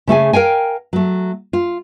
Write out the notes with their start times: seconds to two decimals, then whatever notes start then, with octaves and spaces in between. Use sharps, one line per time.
0.07 C#3 A3 G#4 G#5
0.33 A#4 F5 G5 G#5
0.93 F#3 A3
1.53 F4